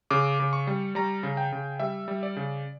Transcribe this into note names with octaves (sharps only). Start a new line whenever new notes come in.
C#3 D6
C#3
C#6
G3
G3 A#5
C#3
G5
C#3
G3 E5
G3
D5
C#3